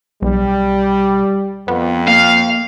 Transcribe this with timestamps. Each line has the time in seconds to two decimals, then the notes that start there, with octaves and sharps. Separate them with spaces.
0.22 B1 G3
1.68 F2 B3
2.08 A#3 F5